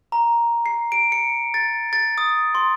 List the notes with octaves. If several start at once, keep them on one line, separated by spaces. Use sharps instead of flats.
A#5
C7
D7
C#7
A6
A6
D#6
C6